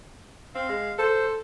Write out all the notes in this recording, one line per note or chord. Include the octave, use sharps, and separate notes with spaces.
C4 F5
G#3
A4 C5